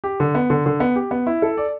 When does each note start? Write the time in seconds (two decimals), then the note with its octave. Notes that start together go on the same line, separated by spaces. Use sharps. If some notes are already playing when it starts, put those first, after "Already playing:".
0.04 G4
0.20 D3
0.35 B3
0.50 D3
0.66 D3
0.80 B3
0.96 G4
1.11 B3
1.27 E4
1.42 A4
1.57 D5